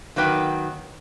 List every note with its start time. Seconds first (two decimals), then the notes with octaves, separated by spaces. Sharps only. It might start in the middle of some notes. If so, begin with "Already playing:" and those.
0.16 D#3 F#3 A#3 B4 G5